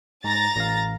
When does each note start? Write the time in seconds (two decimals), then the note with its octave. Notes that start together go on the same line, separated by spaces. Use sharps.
0.24 G#2 A#5 A6 A#6
0.56 A1 F5